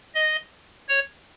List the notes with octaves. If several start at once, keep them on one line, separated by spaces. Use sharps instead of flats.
D#5
C#5